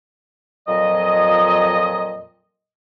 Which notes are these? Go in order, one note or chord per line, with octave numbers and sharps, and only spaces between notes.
F2 A#2 F#3 D#5